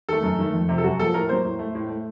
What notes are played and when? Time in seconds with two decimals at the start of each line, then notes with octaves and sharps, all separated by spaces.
0.09 D#3 A3 A4
0.23 F#2
0.38 D#3 A3
0.53 F2
0.69 C3 F3
0.78 A4
0.84 F#2 F#4
0.99 F3 A#3 A4
1.14 A2 A#4
1.29 F#3 A#3 C5
1.45 A2
1.59 A3
1.75 A2
1.89 A3